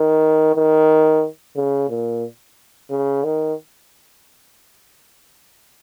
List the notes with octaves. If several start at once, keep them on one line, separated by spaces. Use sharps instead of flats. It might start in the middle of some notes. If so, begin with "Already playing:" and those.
Already playing: D#3
D#3
C#3
A#2
C#3
D#3